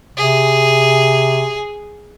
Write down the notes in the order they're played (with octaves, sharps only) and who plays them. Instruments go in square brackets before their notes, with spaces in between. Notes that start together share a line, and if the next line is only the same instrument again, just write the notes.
[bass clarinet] C3 [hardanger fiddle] G#4